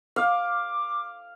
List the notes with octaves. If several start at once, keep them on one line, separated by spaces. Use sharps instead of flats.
F5 D6